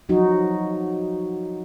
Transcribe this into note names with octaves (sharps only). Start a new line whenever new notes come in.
F3 F#3 D#4 F#4